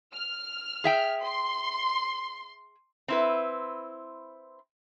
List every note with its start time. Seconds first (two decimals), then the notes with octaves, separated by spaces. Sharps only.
0.15 F6
0.84 G#4 E5 G5
1.23 C6
3.08 C4 E4 B4